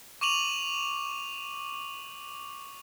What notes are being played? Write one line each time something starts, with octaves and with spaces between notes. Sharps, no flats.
C#6 D6 D#7 F7 F#7